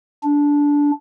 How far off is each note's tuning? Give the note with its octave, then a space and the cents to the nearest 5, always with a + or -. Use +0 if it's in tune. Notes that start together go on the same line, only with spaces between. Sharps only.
D4 -15